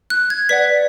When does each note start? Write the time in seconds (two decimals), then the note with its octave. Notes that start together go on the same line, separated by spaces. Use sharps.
0.10 F#6
0.30 G#6
0.49 B4 D5 F#5 B6